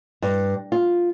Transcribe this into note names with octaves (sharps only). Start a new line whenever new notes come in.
G2
F4